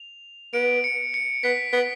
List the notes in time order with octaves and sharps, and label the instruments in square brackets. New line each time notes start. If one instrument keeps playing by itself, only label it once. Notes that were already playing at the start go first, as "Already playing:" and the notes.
Already playing: [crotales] F7
[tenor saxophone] B3 [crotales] D7
[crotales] C#7
C#7
[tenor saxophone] B3 [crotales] B6
[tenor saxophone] B3